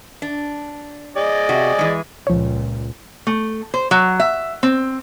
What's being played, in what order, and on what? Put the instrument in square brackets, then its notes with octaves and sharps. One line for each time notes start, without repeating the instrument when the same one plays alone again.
[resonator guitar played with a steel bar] D4
[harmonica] G#4 D5 D#5
[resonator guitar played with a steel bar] C3 F#4
E3 G#3
[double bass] C#2 A#2 [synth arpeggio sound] F3 C#5
[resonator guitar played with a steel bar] A3
C5
F#3
E5
C4